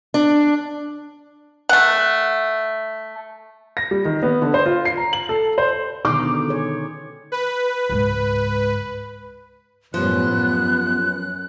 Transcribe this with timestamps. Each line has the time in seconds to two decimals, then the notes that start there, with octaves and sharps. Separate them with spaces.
0.14 D4
1.69 A3 F#5
3.77 A#6
3.91 G3
4.05 D#3
4.23 B3
4.42 D3
4.54 C5
4.66 F4
4.85 C7
4.97 A#5
5.13 F#7
5.29 A4
5.58 C5
6.05 B2 D3 D#3 D#4 C5 D6
6.49 G#4 C#5
7.32 B4
7.89 C#2 G#2
9.94 F#2 A2 F3 G3 B3 F#6
10.32 F#2